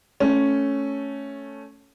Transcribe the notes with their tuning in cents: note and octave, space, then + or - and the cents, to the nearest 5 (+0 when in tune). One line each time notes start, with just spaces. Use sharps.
A3 +0 C#4 +0